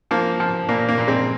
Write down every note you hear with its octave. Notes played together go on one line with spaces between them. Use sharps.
F3 A#3
F3
A#2 A#3
A#3
A#2
G#3 C4